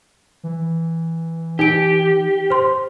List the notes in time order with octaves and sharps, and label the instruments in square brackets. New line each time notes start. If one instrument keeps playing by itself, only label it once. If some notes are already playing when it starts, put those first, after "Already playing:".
[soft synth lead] E3
[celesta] D#4 D7 [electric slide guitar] G4
[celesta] C5 C6